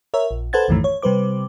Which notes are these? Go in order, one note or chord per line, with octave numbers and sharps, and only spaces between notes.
A#4 C#5 E5
A#1
A4 B4 C5 F#5 G#6 A6
B1 F#2 A2 D#3 E3 A3
C#5
C3 G3 B4 C5 D6